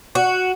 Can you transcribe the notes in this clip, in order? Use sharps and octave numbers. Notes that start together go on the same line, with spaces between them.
F#4